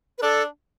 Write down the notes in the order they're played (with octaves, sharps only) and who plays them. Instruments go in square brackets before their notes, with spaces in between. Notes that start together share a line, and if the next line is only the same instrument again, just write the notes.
[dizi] B4
[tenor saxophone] D4 [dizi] A4